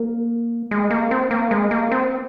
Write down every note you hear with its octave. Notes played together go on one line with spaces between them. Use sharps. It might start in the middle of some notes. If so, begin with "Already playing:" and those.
Already playing: A#3
G#3
A#3
C4
A#3
G#3
A#3
C4